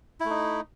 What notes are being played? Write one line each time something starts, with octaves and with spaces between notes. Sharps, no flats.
A3 D#4 E4